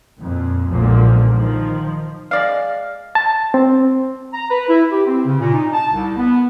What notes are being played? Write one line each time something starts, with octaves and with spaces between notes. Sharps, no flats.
F2 A#2
B1 A#2 D3 F3 G#3 A#3
D#3 F3
G#3 D5 F5
A5
C4
A#5
B4
E4
G4
C4
C#3
A#2
D#4
A5
C2
B3